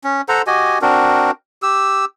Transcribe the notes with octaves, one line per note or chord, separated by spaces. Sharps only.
C#4
A4 C5 F#5 A#5
F#4 G4 D#5 G#5
C4 D4 F#4 A#4
G4 E6